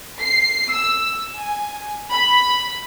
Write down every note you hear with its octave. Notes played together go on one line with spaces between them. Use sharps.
C7
E6
G#5
B5